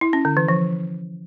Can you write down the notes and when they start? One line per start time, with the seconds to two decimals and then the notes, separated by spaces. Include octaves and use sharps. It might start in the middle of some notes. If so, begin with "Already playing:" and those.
0.01 E4
0.13 C#4
0.25 D3
0.37 E3
0.48 F3